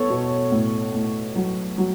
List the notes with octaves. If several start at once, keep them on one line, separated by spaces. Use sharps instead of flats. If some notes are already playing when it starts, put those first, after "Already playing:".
Already playing: B3 A4 C#5
B2
A2
A2
F#3
F#3